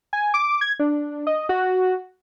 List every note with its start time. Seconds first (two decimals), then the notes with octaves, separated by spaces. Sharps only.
0.13 G#5
0.34 D6
0.61 G#6
0.79 D4
1.27 D#5
1.49 F#4